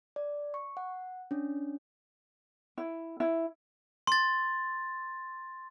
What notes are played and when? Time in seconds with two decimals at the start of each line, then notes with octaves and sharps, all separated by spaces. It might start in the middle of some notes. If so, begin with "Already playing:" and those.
0.16 D5
0.54 C#6
0.77 F#5
1.31 C#4 D4
2.78 E4
3.20 E4
4.07 C6 A6